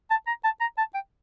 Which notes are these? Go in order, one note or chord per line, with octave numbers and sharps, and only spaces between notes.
A5
A#5
A5
A#5
A5
G5